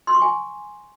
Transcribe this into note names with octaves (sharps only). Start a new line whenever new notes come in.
C6
C#6
G#5